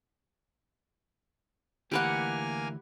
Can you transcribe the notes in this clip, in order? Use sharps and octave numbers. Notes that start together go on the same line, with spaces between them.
D2 E3 A#3 G4 B4 F#5 G#5 F6